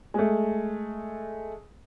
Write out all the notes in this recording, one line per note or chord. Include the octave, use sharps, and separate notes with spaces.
G#3 A3